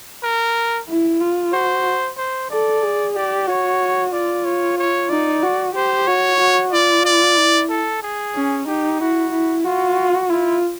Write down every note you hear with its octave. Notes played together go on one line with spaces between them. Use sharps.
A#4
E4
F4
F#4 C5
C5
A4 D5
G#4
G4 D5
F#4 C#5
F4 D5
C#5
C#5
D#4 D5
F#4
G4 C5
F#4 C#5
F#4
F4 D5
D5
E4
A4
G#4
C#4
D#4 G4
E4 F#4
E4
F4 F#4
E4 F4